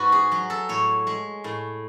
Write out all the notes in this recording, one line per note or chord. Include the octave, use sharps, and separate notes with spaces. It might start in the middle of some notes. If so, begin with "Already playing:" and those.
Already playing: G#2 F#4 B4
G#4
F#3
A4
A2 C#5
G#3
A2